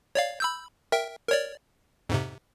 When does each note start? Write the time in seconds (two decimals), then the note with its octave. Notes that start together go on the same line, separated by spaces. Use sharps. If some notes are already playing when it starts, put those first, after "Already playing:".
0.15 C#5 D5 F5
0.40 B5 E6 G6
0.92 A#4 E5 G5
1.29 A#4 C#5 D5
2.09 F2 G#2 C3